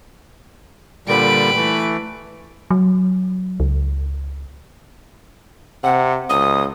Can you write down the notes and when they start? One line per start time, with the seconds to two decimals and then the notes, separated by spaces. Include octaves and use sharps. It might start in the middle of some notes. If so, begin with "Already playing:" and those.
1.07 A#2 D3 G3 B4 D7
1.55 E3 A3
2.71 F#3
3.60 C#2
5.83 C3 F#5
6.30 C#2 D#6